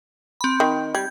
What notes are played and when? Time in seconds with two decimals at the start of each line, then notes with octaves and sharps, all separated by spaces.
0.41 C4 B5
0.60 D#3
0.95 G3 G6 G#6